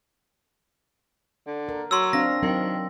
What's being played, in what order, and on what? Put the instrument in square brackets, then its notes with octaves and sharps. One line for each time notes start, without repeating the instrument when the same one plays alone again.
[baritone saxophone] D3
[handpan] A#4
[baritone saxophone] F#3 [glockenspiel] C6 E6
[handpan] C4 D4 F5 [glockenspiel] A#6
[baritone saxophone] D#3 [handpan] F#3 C4